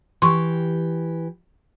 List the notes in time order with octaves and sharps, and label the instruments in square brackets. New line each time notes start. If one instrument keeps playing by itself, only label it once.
[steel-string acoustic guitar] E3 G4 [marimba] C6 C#6